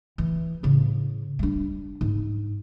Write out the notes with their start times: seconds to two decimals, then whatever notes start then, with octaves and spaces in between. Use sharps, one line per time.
0.18 E3
0.63 A2 C#3
1.39 G3 D4
2.01 G#2